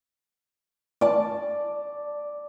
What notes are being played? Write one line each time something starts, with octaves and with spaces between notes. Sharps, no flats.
D5 A5